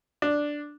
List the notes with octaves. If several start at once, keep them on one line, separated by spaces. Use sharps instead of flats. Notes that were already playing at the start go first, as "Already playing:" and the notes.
D4